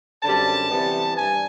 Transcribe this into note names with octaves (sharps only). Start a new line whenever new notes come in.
F#2 D3 G3 C4 A5
C3 E3 G3 B3
G2 G#5